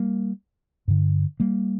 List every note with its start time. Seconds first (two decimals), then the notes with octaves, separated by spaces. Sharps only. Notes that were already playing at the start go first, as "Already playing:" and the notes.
Already playing: G3 A#3
0.88 G2 D3
1.40 G3 A#3